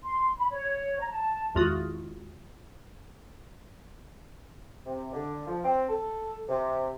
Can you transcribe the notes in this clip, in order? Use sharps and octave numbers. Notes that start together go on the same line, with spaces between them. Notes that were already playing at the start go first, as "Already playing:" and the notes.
C6
B5
C#5
A#5
A5
G#1 E2 F4 F#4 D#6
C3
D3
F3
C4
A4
C3